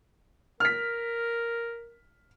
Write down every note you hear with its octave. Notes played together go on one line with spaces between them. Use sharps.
A#4 F6 B6